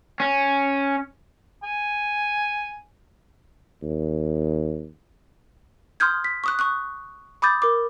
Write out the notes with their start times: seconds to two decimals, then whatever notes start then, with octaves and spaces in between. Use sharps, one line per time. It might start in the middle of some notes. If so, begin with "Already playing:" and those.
0.20 C#4
1.63 G#5
3.83 D#2
6.00 C6 D#6 F6 G6 G#6
6.24 B6
6.44 C#6 D#6 F#6
6.59 C#6 D#6 F#6
7.42 B5 D6 D#6 G6 A6
7.62 A#4 D6